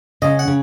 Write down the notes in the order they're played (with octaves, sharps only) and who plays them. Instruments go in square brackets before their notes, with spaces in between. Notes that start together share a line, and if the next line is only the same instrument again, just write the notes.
[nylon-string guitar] C#3 [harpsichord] D#5
[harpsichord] F#5
[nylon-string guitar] C#3